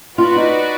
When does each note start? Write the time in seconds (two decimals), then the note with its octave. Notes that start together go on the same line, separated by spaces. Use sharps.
0.18 F4 F#4 B4 D5
0.36 D#4